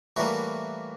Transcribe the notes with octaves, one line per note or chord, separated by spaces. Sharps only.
A2 E3 G3 A#3 F#4